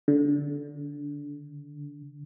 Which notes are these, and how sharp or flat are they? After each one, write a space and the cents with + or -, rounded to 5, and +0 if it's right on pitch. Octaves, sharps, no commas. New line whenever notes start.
D3 -20